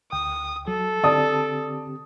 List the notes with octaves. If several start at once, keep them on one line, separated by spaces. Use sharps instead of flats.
D2 G5 D#6
F#3 A4
D3 C4 G4 D5 A5 D#6